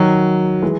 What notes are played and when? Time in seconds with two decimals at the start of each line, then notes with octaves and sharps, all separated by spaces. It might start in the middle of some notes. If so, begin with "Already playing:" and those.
Already playing: D#3 F#3
0.62 E3 G#3